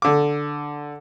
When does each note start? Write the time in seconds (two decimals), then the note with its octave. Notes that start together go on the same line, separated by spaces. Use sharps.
0.02 D3 D6